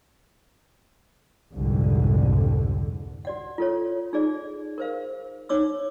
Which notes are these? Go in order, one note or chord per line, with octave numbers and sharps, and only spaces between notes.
C2 F2 G#2 D3
F#4 D5 F#5
F4 A4 C#5
D#4 G#4 D5
A#4 C5 F5
D#4 C#5 D6 E6